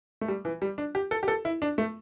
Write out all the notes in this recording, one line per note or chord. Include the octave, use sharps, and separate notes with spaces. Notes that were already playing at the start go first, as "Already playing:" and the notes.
A3
G3
E3
G3
D4
G4
A4
G4
A4
E4
D4
A3